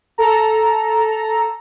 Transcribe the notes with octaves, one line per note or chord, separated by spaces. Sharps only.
A4 A#5